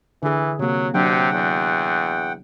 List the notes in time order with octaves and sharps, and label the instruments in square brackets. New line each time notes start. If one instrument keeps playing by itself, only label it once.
[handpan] D3 G#4 [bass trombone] E3
[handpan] C3 A#3 [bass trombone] F#3
[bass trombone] C3 [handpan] F#3 D4 [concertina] F#5 G5
[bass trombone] E2